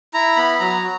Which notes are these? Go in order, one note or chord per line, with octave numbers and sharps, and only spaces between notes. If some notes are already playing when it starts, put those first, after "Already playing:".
E4 A#5
B3 B5
F#3 A#5
F#4